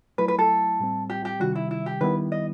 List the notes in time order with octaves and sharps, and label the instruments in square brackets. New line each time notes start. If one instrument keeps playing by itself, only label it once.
[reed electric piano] F#3 A3 E4 [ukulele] B4
[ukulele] B4
A4
[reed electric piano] A2 G3 C4
[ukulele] G4
G4
[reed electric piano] C3 D#3 G3 [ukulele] F#4
[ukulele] E4
E4
G4
[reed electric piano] D#3 G3 B3 E4 [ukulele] B4
[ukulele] D#5